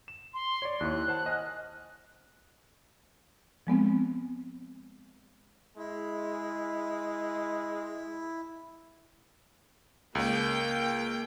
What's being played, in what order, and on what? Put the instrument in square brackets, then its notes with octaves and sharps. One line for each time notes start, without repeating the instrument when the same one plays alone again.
[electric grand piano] E7
[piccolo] C6
[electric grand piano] C#5 D5
[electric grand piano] D#2 E4 C#6 [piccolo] F#6
[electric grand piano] C5 F#5 A5
D#5 G#5 F6
[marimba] F3 G#3 B3 C4
[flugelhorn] G#3 [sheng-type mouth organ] E4
[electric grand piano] C#2 [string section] A#3 G5